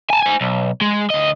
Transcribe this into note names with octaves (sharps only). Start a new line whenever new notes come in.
G#5 A5
C5 G#5
B1
G#3
D2 D#5